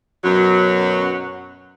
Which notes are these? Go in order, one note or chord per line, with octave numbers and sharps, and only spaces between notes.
F#2 B2 F#3